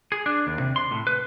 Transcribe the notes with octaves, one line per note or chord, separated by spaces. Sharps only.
G#4
D4
D#2
C3
C6
A2
B4